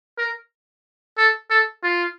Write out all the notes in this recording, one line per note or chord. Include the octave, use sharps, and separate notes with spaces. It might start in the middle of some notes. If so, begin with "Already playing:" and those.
A#4
A4
A4
F4